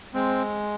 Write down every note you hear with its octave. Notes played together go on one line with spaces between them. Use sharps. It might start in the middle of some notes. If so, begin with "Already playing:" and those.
G#3 C4